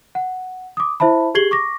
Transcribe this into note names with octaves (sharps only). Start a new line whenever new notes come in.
F#5
D6 D#6
E4 C5 E5 A5 B5
G4 G#4 G#6 C7 F#7 G7
C#6 D6 A#6